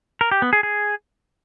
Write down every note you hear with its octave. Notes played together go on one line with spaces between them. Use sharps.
A#4
G4
B3
G#4
G#4